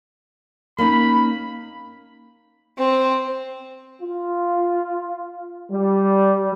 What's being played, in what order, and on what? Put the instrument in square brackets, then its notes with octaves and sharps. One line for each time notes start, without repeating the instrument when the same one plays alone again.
[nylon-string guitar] A#3 C#4 D#4 [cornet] B5
[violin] C4
[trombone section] F4
G3